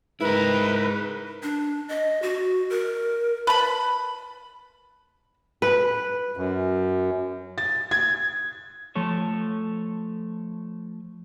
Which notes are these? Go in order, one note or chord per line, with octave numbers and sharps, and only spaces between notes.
G#2 E4 A#4 B4
D4
D#5
F#4
A#4
B4 A5 B5
B4
F#2
A6
G#6
F3 A3 A4 C#5